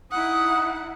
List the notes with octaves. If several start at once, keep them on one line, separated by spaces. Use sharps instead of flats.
D#4 E4 F#5 D#6